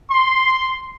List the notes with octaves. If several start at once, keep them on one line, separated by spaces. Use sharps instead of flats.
C6